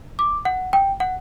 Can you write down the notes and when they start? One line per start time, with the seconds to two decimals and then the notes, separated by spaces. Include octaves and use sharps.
0.19 D6
0.45 F#5
0.73 G5
1.00 F#5